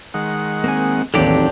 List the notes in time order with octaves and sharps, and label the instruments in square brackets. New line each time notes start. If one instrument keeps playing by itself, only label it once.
[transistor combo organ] D#3 G#3 F#5
[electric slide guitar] A#3 C4 G#5
[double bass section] A1 D#2 [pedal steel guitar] F#3 D4 G4 [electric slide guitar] C4 D#4 A4